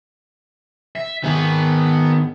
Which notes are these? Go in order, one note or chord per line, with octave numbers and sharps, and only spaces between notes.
E5
D#3 B3 G#4